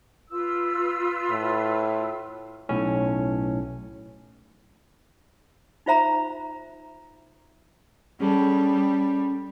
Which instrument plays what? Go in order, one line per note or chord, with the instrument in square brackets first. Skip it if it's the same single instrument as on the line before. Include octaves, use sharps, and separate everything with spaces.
[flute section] F4 B4 E6
[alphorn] A2
[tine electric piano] B1 A2 C#4
[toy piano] D#4 F4 C5 E5 A#5 B5
[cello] G3 [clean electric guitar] C#4 G#4 A4